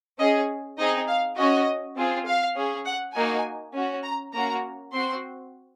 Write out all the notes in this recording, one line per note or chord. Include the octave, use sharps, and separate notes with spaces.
C#4 G#4 D#5
C4 D#4 G#4 D#5
F5
C#4 F#4 D#5
C4 F4 G#4
F5
C#4 G#4
F#5
A#3 D#4 F#4 G#5
C#4 F#4
A#5
A#3 C#4 F#4 A#5
C4 F#4 C6